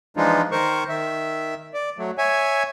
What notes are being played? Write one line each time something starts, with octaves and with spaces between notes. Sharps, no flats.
E3 F3 G#3 D4 D#4 F4
D#3 A#4 C5 C#6
D#3 E5
D5
F#3 A3
C#5 E5 G#5